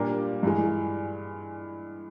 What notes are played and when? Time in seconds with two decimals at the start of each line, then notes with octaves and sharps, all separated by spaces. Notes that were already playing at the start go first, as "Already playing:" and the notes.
Already playing: A#2 G3 A#3 D4 G4
0.43 G2 E3 G#3